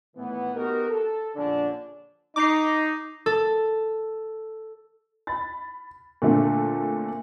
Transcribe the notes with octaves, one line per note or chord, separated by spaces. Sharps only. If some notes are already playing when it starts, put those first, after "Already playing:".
A2 D#3 E3 B3
B3 D#4 F#4 G4 A#4
A4
A#1 D3 C#4 D4
D#4 D6 C7
A4
B5 A6
A#2 D3 A3 C4 A4